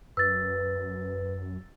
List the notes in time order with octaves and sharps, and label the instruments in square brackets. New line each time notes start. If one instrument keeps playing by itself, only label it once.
[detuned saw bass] F#2 [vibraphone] B4 [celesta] E6 A6